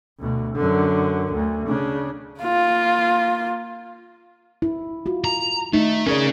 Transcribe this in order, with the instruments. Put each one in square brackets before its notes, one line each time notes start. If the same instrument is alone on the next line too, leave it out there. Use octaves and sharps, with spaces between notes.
[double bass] D2 B2
F#2 D3
D2
C#3 D4
[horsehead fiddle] A#3 F4
[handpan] E4
F4 F#4
[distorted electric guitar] A#5
[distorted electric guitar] A3 [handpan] D#4
[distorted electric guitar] C#4 G#4 [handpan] A#4 D5